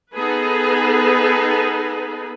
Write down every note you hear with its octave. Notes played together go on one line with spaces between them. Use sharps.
B3 D#4 G#4 A4 B4